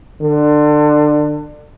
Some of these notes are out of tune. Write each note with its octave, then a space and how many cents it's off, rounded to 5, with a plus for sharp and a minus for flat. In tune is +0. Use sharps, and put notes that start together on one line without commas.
D3 +25